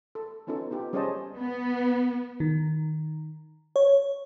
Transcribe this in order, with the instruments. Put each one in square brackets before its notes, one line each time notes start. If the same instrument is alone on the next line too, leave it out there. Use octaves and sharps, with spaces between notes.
[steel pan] A4
B3 C#4 D#4 F4 A4
B3 D#4 F4 G4
G3 C#4 G#4 C5 D#5 A5
[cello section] B3
[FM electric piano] D#3
C#5